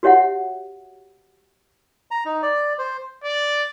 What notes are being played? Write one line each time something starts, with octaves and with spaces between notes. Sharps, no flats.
F#4 G4 C#5 E5 F#5
A#5
D#4
D5
C5
D5